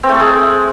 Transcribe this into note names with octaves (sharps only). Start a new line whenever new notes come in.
C4
A3
A4
G#3